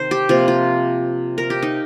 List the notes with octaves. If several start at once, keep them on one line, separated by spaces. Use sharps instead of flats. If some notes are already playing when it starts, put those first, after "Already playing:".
Already playing: C3 D#3 C5
G4
C3 F3 A#3 F4
F4
A#4
G4
D#4